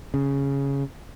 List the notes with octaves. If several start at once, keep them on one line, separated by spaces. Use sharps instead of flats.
C#3